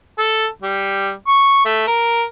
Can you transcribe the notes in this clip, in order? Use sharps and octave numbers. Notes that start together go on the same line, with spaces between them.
A4
G3
C#6
A3
A#4